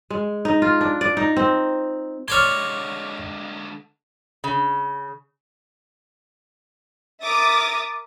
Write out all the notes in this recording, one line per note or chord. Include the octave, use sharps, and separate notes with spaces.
G#3
D#4
F4
D4
D5
D#4
C4
D3 G#3 C#5 D5 C6 F6 G#6
C#3
A#4 E5 D6 D#6 A6